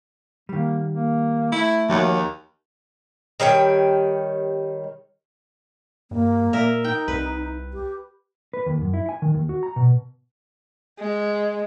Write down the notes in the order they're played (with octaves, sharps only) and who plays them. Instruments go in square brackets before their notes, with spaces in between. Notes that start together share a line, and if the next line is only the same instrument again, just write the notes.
[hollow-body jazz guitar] D#3 G3 [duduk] A#3
[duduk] A#3
[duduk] A3 [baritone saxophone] E4
[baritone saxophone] D#2 [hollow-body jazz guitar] F3 F#4 C#5
[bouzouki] D#3 G3 C#5 G5
[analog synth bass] G2 [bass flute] A#3
[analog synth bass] A#2 [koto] A#4 E5
[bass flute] D#4 [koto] G5
[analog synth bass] C2 [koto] B4
[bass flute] G4
[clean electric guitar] B4
D#2
F#2
E4
G#5
D#3
D#2
F#4
A#5
B2
[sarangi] G#3